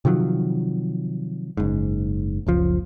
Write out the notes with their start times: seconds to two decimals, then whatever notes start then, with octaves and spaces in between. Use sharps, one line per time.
0.05 C3 D#3 F3 F#3
1.57 F#1 G#2
2.47 F#1 C#2 F3